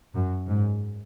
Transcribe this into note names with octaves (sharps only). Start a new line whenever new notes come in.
F#2
G#2